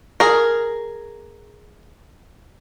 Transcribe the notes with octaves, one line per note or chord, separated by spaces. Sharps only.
G#4 A#4